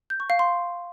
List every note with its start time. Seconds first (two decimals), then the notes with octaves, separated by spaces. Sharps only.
0.10 G6
0.20 C#6
0.30 F5
0.39 C6